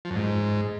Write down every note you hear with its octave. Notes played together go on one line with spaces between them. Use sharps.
F3
F#2
G#2